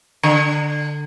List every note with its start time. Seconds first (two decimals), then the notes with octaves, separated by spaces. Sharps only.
0.23 D3